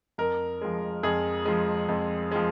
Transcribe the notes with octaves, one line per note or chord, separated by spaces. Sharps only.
F2 A#4
F3 G#3
F2 G#4
F3 G#3
F2
F3 G#3